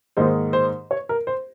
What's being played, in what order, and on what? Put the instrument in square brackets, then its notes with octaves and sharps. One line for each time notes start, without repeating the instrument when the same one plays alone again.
[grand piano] G#2 D#3 A#3 D#4 C5
C5
C#5
A#4
C5